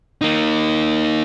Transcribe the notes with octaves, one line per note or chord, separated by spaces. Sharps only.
A#3 D#4